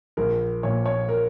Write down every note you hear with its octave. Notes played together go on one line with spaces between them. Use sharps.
A#1 A#4
A#2 F3 C#5
C#5
A#4